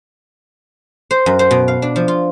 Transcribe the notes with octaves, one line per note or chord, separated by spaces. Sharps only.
C5
F#2
C5
B2
F5
D4
F3
F4